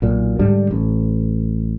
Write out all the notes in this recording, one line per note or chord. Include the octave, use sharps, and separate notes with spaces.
B1 A#2
G#2 D3 G3 D4
A1